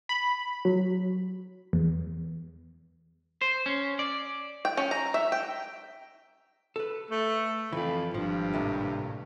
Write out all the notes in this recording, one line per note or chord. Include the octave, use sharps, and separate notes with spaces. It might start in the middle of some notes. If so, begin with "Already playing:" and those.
B5
F#3
E2
C5
C#4
D5
G5
C#4
A#5
E5
G5
A4 B4
A3
F2 E3
G#1 G2 F3
D#2 A2 C3